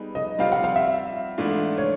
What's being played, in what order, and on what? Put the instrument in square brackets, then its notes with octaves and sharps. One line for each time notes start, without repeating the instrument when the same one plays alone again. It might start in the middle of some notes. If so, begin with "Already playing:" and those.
Already playing: [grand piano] G3 B3 D#4 G#4
[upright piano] D#5
[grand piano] G3 C4 F4 [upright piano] F5
[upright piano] F#5
F5
E5
[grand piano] G#2 E3 A3 D4 F4
[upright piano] C#5